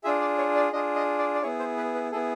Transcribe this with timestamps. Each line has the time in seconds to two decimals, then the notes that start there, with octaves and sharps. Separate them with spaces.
0.04 D4 F4 G#4 E5
0.21 D5
0.38 C#5
0.55 D5
0.72 D4 F4 G#4 D#5
0.96 D#5
1.19 D5
1.35 D5
1.42 B3 E4 G#4 C#5
1.59 C5
1.77 B4
1.94 B4
2.12 B3 E4 G#4 A4